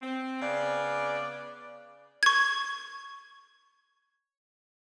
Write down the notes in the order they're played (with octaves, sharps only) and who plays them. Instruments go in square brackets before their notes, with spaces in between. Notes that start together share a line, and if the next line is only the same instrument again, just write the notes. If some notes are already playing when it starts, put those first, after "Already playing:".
[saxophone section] C4
C#3 B3 D5
[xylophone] C#6 G#6